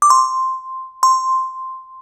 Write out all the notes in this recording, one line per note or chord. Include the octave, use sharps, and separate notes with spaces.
D6
C6
C6